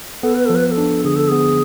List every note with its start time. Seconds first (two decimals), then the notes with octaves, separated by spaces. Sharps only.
0.23 B3 A4
0.34 B4
0.46 F3 A4
0.55 B4
0.67 B4
0.71 A4
0.77 D4
1.04 D3 G#4
1.16 A4
1.28 B3 G#4